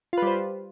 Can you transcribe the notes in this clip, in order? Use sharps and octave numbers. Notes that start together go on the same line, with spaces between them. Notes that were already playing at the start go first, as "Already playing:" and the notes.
G3 F4 B4 C5